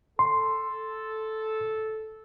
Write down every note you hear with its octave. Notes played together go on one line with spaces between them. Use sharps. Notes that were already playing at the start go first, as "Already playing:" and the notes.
A4 C6